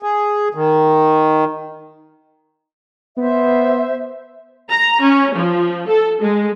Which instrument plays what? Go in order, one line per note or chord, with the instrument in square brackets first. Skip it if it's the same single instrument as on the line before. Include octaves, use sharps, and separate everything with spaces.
[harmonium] G#4
D#3
[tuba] B3 [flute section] C5 E5
[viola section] A#5
C#4
F3
A4
G#3